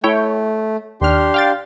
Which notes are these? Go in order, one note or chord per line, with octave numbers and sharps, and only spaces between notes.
A3 E4 C#5 G5
D#2 D4 G4 C6 F6
F5 G5 A6